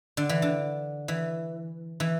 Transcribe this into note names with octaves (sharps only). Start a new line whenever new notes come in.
D3
E3
D3
E3
E3